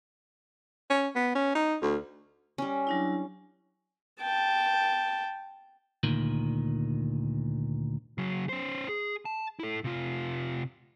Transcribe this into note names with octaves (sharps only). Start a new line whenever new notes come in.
C#4
B3
C#4
D#4
D2
G3 C#4
F#3 D4 E4
G5 A5
D2 A#2 D#3
C#3 F#3
C#4 C5
G#4
A5
E4 A4
C3 F4